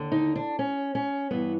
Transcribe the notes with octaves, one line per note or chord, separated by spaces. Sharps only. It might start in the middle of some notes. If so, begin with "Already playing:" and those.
Already playing: D#2 D3
D#4
D4
C#4
C#4
G2 E3 B3